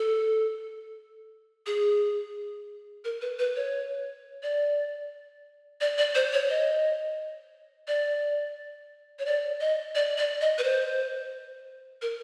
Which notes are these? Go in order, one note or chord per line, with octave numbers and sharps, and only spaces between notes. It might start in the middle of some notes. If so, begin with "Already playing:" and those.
Already playing: A4
G#4
A#4
B4
B4
C#5
D5
D5
D5
C5
C#5
D#5
D5
C#5
D5
D#5
D5
D5
D#5
B4
C5
A#4